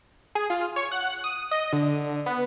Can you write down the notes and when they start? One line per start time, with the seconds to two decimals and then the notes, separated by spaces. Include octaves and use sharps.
0.35 G#4
0.50 F4
0.76 C#5
0.91 F#5
1.24 D#6
1.51 D#5
1.73 D3
2.26 B3